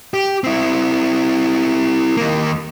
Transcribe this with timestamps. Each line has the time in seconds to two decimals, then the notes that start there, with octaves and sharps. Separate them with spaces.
0.14 G4
0.44 C4 E4
2.17 D#2 A#3